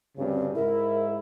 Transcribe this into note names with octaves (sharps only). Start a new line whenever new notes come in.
D2 G2 C#3 C4
G#2 E4 A#4